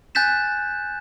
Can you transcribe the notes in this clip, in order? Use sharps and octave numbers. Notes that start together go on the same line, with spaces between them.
G#5 F#6 G6 A6 B6 E7